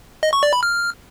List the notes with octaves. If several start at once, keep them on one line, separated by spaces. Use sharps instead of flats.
D#5
C#6
D5
B5
F6